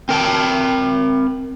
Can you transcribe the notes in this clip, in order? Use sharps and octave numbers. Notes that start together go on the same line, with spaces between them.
C4 A#4 G5 A5